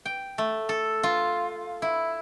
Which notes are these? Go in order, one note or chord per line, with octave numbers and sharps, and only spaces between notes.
G5
A3
A4
F4
E4